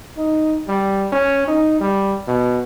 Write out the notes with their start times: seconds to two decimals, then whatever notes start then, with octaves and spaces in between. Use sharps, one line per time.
0.17 D#4
0.68 G3
1.12 C#4
1.47 D#4
1.80 G3
2.27 B2